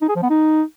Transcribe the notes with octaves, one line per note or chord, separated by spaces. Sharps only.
D#4
G#4
F3
B3
D#4